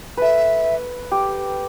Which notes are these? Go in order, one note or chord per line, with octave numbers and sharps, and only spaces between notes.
A4 B4 E5
G4